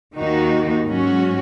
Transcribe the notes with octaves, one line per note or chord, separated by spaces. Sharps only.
D#2 D#3 A#3 D#4 F#4
G#2 F#3 C#4 F#4